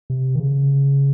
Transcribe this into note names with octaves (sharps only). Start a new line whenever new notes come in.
C3
D#3
C#3